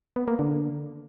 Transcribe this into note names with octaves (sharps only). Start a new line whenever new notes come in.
B3
A#3
D3